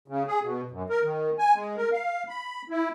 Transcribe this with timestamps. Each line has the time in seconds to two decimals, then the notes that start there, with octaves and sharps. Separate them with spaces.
0.08 C#3
0.27 G#4
0.43 B2
0.71 F#2
0.89 A#4
1.03 D#3
1.39 G#5
1.55 G#3
1.77 A#4
1.92 F5
2.29 B5
2.70 E4